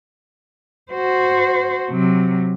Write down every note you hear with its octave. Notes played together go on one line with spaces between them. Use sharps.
F#4 C5
C3 F#3